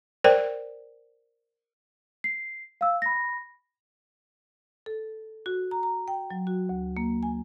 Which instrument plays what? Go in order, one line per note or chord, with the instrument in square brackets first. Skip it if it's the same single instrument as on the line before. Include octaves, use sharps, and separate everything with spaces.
[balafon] A#4 C5 D5 G5
[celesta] C7
F5 E6
B5 A#6
[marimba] A4
F#4
A#5
A#5
G5
F#3
F#4
D2
A#3
G#5